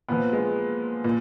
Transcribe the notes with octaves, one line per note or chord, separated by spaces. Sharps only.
A#2 F3 B3
G#3
A#2